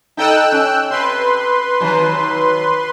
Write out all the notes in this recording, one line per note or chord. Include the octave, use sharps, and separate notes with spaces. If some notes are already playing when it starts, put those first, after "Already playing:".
D#4 A4 D#5 G5 E6 F#6
C#4
C3 B4 C6
C3 D#3 F#3